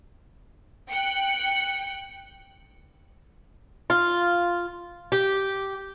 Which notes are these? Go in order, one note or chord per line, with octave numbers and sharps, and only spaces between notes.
G5 F#6 C#7
F4
G4